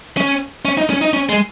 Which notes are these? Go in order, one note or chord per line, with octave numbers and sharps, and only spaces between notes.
C#4
C#4
D#4
C#4
D#4
C#4
G#3